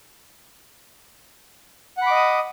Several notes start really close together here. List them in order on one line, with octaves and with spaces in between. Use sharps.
F#5 B5 D6 D#5 D#6